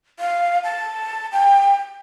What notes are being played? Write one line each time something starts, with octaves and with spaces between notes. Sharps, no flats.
F5
A5
G5